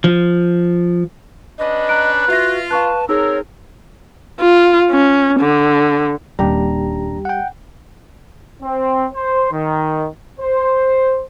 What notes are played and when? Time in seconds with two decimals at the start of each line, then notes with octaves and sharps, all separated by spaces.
0.04 F3
1.58 C#4 D4 B4 D#5
1.89 A#5 F#6 D7
2.28 F4 F#4 B4 E5 A#6
2.71 B4 F5 A5 C#6 F#6
3.09 C4 D#4 G#4 A#4 C#5 E6
4.40 F4
4.90 C#4
5.40 D3
6.39 D#1 D#2 G3 D4 G4 A#5
7.25 F#5 G5
8.63 C4
9.13 C5
9.52 D#3
10.40 C5